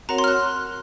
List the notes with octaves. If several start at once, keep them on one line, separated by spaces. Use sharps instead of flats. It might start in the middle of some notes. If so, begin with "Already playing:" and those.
C4 F#4 A#4 C#5 F#5 A#5
C6
F6
F#6